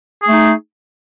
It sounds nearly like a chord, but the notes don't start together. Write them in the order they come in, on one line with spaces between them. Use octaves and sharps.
G#4 A3 D#4